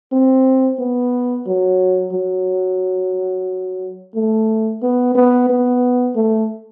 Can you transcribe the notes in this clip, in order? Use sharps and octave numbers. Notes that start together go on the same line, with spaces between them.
C4
B3
F#3
F#3
A3
B3
B3
B3
A3